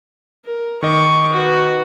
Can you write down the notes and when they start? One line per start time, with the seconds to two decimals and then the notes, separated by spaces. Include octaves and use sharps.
0.45 A#4
0.83 D#3 D#5 C#6 D6
1.32 F#4 B4